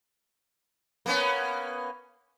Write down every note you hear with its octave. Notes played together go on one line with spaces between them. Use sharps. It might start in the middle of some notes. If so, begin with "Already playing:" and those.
A#3 B3 C#4